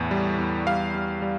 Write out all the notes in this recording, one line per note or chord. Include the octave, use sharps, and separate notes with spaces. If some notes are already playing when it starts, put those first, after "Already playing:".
Already playing: E2 A2
G3
E2
G3 F5
G3
G3